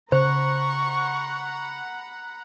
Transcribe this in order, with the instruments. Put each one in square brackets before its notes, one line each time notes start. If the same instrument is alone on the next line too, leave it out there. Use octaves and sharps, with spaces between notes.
[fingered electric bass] C#3 [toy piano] C5 [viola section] F#5 A#5 B5 [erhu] C#6